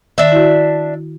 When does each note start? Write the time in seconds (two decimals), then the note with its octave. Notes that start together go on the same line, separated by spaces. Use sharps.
0.18 D#3 D4 E5
0.32 E4 F#4